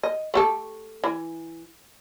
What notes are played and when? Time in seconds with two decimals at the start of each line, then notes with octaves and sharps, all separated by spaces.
0.03 D#5
0.34 A3 G4 A4
1.04 E3